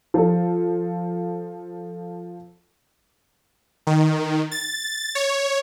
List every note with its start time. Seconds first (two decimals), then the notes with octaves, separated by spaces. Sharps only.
0.14 F3 A4
3.87 D#3
4.51 A6
5.15 C#5